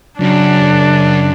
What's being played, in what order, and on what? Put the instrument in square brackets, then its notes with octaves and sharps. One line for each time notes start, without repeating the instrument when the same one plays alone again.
[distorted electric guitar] F#2 [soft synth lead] C#3 [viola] D4